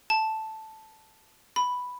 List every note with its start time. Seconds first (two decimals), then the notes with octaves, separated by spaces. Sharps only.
0.10 A5
1.56 B5